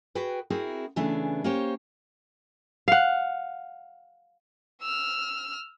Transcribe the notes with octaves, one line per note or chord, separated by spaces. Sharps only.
F#4 G#4 B4 G5
C4 E4 F#4 G#4 A#4
C#3 E3 A3 B3 D4 G#4
A#3 C#4 G4 C5 C#5
F5 F#5
E6 F6